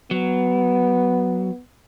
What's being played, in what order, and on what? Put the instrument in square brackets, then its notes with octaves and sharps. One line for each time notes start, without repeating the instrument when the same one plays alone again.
[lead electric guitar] F#3 [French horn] B3